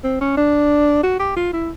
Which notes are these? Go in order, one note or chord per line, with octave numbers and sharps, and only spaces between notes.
C4
C#4
D4
F#4
G4
F4
E4